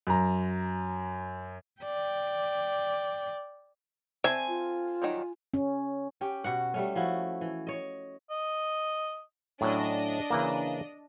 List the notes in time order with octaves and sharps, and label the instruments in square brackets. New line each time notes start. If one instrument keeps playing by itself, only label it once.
[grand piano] F#2 A#5
[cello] D5 G5
[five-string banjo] C4 A4 E5 [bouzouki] G#5
[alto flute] F4
[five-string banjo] D#3 F#3 G3
[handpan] C#4
[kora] C#4 G4
B2 F#4 F#5
G3 A3 C#4
F3 C#4 E4 F#4
E3
C#5 D#5
[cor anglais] D#5
[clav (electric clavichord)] A2 F#3 C#4 [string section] D4 D#5
[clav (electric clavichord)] C#3 E3 A#3